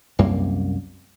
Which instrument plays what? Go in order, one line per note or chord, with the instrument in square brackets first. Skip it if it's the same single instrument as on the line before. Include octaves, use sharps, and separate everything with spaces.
[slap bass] C2 F#2 A#3